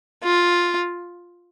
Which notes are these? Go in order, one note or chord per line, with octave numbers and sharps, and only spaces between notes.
F4